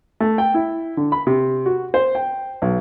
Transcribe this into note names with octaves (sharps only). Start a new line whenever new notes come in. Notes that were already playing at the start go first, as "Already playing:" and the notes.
A3
G5
E4
D3
B5
C3
F#4
C5
G5
B1